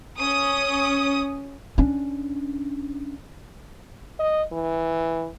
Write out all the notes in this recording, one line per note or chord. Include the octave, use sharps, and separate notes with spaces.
C#4 D#6
C#4 D4
D#5
E3